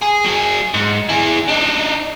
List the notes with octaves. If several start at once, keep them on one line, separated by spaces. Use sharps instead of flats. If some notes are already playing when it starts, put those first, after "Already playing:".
G#4
F#3 G#4
G#2
E4 G#4
D4 D#4